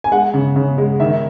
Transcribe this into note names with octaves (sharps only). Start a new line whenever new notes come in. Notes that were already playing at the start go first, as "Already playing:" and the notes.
G#5
G#3 F#5
C#3
C#3
G#3
D#3 E5